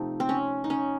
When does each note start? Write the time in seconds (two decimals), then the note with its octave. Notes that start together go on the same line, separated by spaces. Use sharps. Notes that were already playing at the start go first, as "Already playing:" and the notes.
Already playing: C3 F3 A3 D#4
0.20 C4
0.29 C#4
0.64 D#4
0.70 C#4